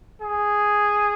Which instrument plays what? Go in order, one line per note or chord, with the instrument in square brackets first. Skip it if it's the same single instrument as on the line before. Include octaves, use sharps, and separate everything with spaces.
[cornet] G#4